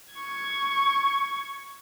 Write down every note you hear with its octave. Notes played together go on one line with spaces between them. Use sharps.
C#6 G#6